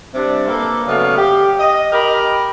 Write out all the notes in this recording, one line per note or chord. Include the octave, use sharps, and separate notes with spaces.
C3 G3 D4
A#3 A4 B4
C#3 F#3 A3 B3 D5 F5
G4
D#5
G4 A#4 B5